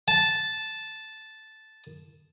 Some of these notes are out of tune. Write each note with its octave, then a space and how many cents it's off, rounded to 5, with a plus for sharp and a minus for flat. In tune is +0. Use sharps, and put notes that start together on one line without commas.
A5 -10